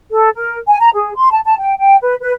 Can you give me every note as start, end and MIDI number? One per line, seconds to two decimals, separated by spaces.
0.11 0.29 69
0.35 0.56 70
0.68 0.77 80
0.81 0.89 82
0.94 1.14 68
1.16 1.31 84
1.32 1.40 81
1.45 1.56 81
1.59 1.73 79
1.78 1.96 79
2.01 2.14 71
2.20 2.32 71